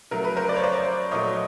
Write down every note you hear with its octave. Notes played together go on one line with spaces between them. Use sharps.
C#3 F#3 A3 A#4
B4
A#4 C5
D5
C#5
C5 D5
A#2 F#3 A3 C#5 D#5